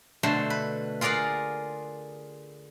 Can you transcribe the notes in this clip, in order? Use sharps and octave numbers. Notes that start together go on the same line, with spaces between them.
B2 D3 A3 C5 A5
B4
F4 G#4 A#4 D5 F5 F#5